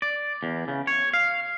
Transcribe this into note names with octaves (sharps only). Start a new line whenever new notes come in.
D5
E2
C#3
C#5
F5